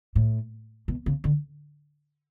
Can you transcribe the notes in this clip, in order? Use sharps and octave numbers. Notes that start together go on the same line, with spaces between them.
A2
B2
C#3
D3